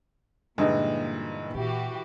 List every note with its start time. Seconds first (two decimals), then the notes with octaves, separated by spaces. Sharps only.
0.58 G2 A#2 D3 E3 G#3 D#4
1.54 A#2 E3 F#4 G4